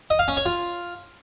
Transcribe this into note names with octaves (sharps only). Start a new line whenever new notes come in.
D#5
F5
C#4
C#5
F4